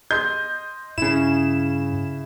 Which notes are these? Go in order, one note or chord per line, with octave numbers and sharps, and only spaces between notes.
D#5 C6 G6
G2 C#3 E4 E7